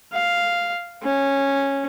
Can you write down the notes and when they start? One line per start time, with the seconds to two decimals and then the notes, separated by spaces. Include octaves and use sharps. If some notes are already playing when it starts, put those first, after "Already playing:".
0.13 F5
1.03 C#4